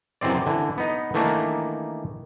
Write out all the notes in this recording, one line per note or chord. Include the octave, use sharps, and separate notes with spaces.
F#2 C3 E3 C4 D5
D3 E3
B3 D#4
D#3 E3 A3 A#3 D4